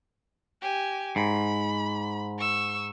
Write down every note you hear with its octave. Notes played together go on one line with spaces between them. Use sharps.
G4 G#5
G#2 B5
C#6 E6